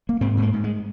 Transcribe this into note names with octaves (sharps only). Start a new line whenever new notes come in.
A#3
G#2 C4
G#2
A#3
G#2
G#3